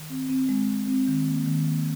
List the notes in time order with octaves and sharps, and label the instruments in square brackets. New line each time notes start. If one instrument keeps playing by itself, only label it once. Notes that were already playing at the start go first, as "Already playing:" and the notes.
Already playing: [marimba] D#3
C4
C4
G#3
C4
C4
D#3
A#3
D#3
A#3